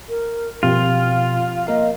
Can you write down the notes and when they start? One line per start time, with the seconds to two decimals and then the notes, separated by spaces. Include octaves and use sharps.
0.08 A#4
0.63 B2 F3 C4 F4 G4 F5
1.67 A#3 A#4 D#5 F5